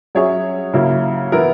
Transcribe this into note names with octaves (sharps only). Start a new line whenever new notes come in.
F#3 C#4 G#4 C#5 E5
C#3 F#3 A#3 E4
E3 B3 E4 A#4